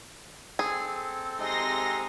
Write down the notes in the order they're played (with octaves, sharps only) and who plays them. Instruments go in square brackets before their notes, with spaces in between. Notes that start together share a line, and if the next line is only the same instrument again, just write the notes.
[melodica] C4 A4 [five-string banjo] G#4
[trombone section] C3 G#3 D#4 [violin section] C6 A#6